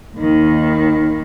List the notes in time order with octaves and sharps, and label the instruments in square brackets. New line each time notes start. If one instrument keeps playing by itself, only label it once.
[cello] D#2 D#3